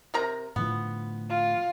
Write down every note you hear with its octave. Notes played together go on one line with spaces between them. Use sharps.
C3 A#4 A#5
A2 D3 F3 B3
F4